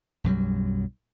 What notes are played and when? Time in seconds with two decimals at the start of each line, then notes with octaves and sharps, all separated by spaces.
0.24 B1 F#2 F#3 G3